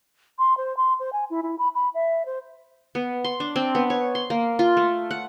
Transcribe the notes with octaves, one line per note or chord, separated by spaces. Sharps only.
C6
C5
C6
C5
G#5
E4
E4
B5
B5
E5
C5
B3
C6
D4
C4
B3
C#5
C6
A#3
F4
A3
F#5